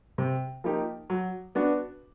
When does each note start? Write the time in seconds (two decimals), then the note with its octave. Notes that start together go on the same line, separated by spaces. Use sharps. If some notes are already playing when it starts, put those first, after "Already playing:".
0.18 C3
0.64 F3 A#3 D#4 G4
1.10 F#3
1.55 B3 D4 F#4